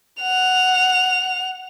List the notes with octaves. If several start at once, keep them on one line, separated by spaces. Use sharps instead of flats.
F#5 F7